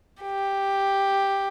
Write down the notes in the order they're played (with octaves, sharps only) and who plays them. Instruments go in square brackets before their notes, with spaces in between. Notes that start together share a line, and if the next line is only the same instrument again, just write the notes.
[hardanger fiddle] G4